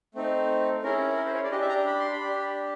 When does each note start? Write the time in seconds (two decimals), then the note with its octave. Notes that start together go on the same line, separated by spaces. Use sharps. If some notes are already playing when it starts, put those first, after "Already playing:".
0.15 A3 C4 D#4
0.83 C#4 E4 G#4 A#4
1.17 A#4
1.26 C5
1.35 C#5
1.44 D5
1.51 D4 G4 D#5
1.61 E5
1.69 A#5
1.86 B5
1.99 C6
2.12 B5
2.20 D4 G4